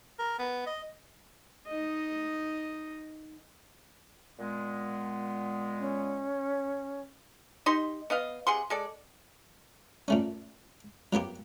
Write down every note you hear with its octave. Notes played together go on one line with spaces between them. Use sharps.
A#4
B3
D#5
D#4 D#5
A#2 G#3 B3
C#4
D#4 G4 D#5 C6
B3 D#5 F5
C3 G#4 F#5 C6
G#3 A4 D5
A#2 A3 C#4
F#3 A#3 B3 G4